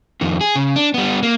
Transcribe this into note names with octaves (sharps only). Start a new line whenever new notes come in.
F2 D#3
G#4
C#3
D4
G3 B3
A#3